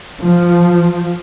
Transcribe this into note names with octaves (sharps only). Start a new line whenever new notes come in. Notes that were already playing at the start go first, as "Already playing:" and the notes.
F3